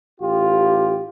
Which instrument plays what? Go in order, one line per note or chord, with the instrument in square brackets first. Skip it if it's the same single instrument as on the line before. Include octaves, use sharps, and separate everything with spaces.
[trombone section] A1 F4 G4